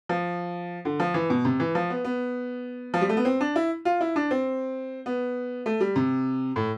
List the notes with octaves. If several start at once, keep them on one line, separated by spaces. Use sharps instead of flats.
F3
D3
F3
E3
B2
C3
E3
F3
B3
B3
F3
G3
A3
B3
C4
D4
E4
F4
E4
D4
C4
B3
A3
G3
C3
A2